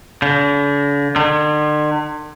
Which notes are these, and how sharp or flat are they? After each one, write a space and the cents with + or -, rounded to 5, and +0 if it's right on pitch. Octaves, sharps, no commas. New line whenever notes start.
D3 -45
D3 +45